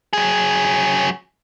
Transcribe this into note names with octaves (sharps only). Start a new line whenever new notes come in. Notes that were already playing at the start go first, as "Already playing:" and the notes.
F#3 G#4